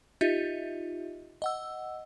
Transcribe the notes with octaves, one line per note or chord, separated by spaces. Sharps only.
D#4 F4 G4 D#5 E5
D#5 F#5 E6